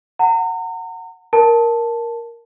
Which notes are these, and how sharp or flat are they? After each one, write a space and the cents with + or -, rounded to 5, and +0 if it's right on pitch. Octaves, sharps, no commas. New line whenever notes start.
F#5 +0 A#5 -35
A#4 +5 A5 +0